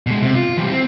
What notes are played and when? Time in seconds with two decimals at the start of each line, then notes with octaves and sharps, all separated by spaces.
0.07 B2 G#3
0.23 C3
0.35 F4
0.57 E3 G3
0.72 C4